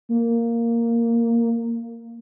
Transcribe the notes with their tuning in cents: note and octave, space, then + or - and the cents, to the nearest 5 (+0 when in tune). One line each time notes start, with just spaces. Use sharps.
A#3 -5